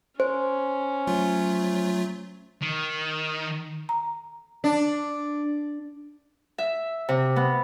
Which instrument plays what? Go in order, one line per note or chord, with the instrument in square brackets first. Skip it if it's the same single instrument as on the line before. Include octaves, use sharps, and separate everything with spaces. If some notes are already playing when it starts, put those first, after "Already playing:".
[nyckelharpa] C#4 [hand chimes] C5
[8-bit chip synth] F#3 A3 F4
[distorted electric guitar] D#3
[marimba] A#5
[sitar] D4
[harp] E5
C3
B3